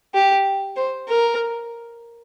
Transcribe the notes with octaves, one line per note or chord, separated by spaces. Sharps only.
G4
C5
A#4